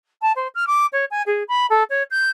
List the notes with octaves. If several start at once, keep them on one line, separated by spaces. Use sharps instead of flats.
A5
C5
F6
D6
C#5
G#5
G#4
B5
A4
C#5
G6